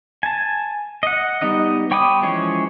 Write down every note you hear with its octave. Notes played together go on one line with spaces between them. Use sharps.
G#5 A5
D#5 F#5
G3 B3 D#4 D#5
C#5 G5 B5 D6 D#6
E3 F3 G#3 C#4 C#5